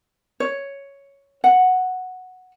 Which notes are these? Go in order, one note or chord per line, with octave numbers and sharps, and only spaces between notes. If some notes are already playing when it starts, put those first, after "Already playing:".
C#5
F#5